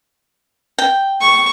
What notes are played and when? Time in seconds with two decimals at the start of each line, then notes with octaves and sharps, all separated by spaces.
0.78 G5
1.21 C#6